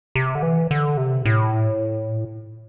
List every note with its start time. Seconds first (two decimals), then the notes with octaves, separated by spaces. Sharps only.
0.15 C3
0.35 D3
0.43 E3
0.71 D3
0.97 C3
1.25 A2